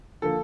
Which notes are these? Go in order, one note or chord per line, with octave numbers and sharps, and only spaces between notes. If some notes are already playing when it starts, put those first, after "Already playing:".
D3 F3 A#3 A4